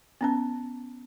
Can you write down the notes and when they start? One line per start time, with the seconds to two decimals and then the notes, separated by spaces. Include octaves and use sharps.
0.21 B3 C#4 A5